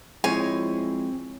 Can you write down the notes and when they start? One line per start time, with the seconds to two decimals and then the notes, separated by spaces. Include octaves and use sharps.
0.24 F3 G#3 C4 E4 C#5 G#5